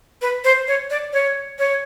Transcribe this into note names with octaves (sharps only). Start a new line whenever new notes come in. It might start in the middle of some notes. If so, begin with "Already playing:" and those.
B4
C5
C#5
D5
C#5
C#5